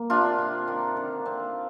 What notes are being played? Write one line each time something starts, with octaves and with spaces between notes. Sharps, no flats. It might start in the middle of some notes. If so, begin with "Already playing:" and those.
Already playing: A#3
C3 D4 F4
C3
D#3
D3
C4